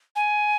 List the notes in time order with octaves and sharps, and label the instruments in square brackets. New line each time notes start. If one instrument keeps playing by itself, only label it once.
[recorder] G#5